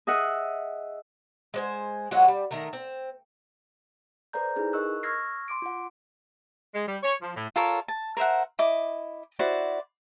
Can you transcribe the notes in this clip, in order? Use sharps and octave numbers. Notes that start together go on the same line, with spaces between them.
G#4 D#5 E5 F#5
G#3 C5 G#5
F#3 G#3 F4 F#4
G3
D#3 A3 A#4
C4
A4 B4 C5 D5 A#5 G6
D#4 E4 G#4 B4
A#4 D#5 C#6 E6 F#6
C#6 E6 F6 G#6 A#6 C7
C6 D6 D7
F4 F#5
G#3
G3
C#5
F3
A2
F4 A4 A#4 C#5
A5
A#4 C5 E5 F#5
E4 D#5 D6
E4 F#4 C5 D5